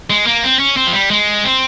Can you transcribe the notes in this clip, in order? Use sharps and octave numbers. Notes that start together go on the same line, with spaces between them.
G#3
A#3
C4
C#4
C4
F3
G3
G#3
C4